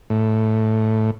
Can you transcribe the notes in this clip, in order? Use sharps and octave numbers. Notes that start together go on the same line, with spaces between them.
A2